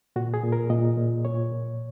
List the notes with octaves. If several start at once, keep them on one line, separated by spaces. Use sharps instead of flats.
A#2 F#4
G#4
A#2
A#4
A#2 D#5
A#2
A#2 C#5
A#2